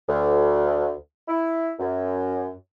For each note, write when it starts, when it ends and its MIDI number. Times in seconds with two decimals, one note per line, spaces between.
0.08 0.92 38
1.28 1.72 64
1.79 2.52 42